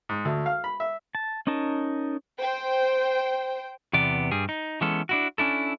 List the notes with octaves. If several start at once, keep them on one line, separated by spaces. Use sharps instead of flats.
G#2
D2
F5
B5
E5
A5
C#4 D#4 A#4 A5
C5 G5
E2 C3 B3 D5
G2 G3 G#4
D#4
E3 G#3 B3 C#4 A4
D4 E4 F#4
C#4 D4 E4 A4